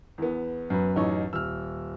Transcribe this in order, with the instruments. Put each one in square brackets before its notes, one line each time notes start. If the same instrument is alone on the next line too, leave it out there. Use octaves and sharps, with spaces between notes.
[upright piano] E2 B3
[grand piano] F#2 B4
[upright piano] A1 D#4 C#5
[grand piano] D#1 [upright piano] E6 F6